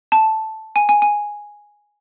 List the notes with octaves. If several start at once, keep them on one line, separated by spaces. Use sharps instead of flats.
A5
G#5
G#5
G#5